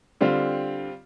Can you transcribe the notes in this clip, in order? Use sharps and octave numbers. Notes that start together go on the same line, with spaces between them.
D3 G3 C4 F4